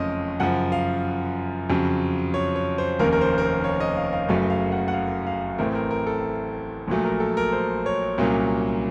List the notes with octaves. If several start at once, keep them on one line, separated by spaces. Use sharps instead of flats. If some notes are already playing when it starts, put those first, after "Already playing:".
Already playing: F#1 F2 C#3 A3 C#4 D#5
F#2 C#3 F3 F#5
F5
F2 C#3 F#3
C#5
C#5
C5
F1 D#2 D#3 A#3 C#4 A#4
A#4
C5
A#4
C5
C#5
D#5
F5
F5
F#1 F#2 C#3 F#3 A3 F5
F5
F#5
F#5
F5
F5
A1 A2 A3 C4 A#4
A#4
A#4
A4
A#1 A#2 F#3 A3
A#4
A4
A#4
C5
C#5
C2 A#2 F#3 A#3 C#4